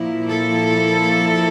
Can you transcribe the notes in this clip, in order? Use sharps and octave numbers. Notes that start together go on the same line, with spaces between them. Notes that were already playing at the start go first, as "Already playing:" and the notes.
Already playing: A#2 F3 A#3 E4
A4